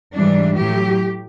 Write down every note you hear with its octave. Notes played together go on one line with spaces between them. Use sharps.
G#2 E3 G3 D4
A2 F#3 G4